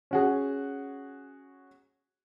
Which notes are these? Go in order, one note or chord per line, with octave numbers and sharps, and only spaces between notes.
C#4 F#4 G#4